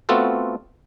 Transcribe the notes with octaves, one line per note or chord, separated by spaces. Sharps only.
A3 B3 C4 F4 F#4 A4